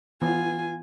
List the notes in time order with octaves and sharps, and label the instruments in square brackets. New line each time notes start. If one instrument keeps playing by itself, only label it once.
[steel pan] E3 B3 [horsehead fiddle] F4 G#5